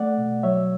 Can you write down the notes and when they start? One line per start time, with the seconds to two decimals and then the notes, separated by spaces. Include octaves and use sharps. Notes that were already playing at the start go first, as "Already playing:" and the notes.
Already playing: A3 D5 F#5
0.18 B2
0.43 F#3 C#5 E5